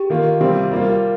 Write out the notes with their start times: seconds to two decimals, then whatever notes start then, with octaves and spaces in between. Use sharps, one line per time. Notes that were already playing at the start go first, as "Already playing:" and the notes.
Already playing: G4
0.10 D#3 A#3 F4
0.40 C3 G3 C4 F4 G4
0.72 G3 A#3 F4